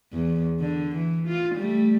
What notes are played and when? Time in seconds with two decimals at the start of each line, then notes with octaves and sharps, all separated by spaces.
0.12 E2
0.60 D3
0.96 E3
1.27 F4
1.56 G3 A3